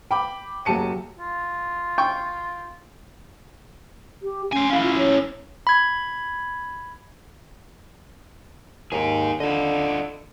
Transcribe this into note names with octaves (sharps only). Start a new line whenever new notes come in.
G5 B5 D6
F#1 F#3 G4 A5 C#7 D#7
F4
G5 C#6
G4
C#4 C5 G#5
C#4 E4 F5
F4
C#5
B5 G#6
D#2 D#4 G#4
D3 F4 D#5